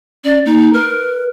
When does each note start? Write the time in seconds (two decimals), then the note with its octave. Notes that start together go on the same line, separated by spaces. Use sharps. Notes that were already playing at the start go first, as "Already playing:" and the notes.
0.24 C#4 D5
0.45 A#3 D#4
0.73 A#4 B4